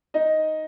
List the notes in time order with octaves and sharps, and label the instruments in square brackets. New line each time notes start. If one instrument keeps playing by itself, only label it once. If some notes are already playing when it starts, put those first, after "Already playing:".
[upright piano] D#4 D#5